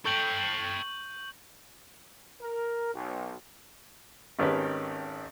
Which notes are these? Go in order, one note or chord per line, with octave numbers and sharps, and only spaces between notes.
A4 G5 C#6 G6 F#7
A#4
B1
G#1 D#3 C#4 G4 B4